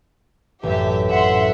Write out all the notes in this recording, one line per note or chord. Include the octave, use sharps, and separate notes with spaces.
A1 F#2 G4 E5
A2 E5 F#5 C6